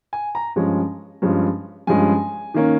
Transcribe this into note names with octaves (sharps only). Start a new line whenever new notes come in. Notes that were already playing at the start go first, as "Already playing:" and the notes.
G#5
A#5
G2 F3 G#3 C#4
G2 F3 G#3 C#4
G2 F3 G#3 C#4 G#5
D#3 A#3 C#4